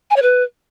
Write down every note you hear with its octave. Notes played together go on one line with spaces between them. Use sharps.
G#5
C#5
B4